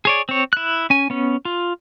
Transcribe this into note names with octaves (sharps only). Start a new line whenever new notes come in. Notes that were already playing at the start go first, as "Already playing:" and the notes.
G#4 C#5 D5
C4 C#5
E4 F#6
C#4 G#5
B3 C#4
F4